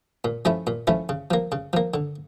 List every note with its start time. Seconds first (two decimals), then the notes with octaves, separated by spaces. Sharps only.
0.25 A#2
0.45 F3 A3 C#4 E4
0.67 A#2
0.87 F3 A3 C#4 E4
1.09 C#3
1.31 F3 A#3
1.52 C#3
1.73 F3 A#3
1.94 D3